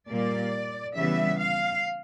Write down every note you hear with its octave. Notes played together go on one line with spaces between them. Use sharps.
A#2 G3 A#3 D5
C#3 E3 G3 B3 E5
F5